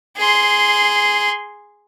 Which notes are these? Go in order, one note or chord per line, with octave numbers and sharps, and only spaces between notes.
G#4 C6